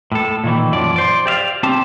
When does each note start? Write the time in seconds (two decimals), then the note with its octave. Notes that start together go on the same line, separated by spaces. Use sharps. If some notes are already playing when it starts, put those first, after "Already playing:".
0.12 A2 A4
0.44 A#2 D#3 E3
0.72 F#2 F3 D5
0.96 C5 D5
1.26 G4 D5 E5 F5
1.63 C4 G4 A5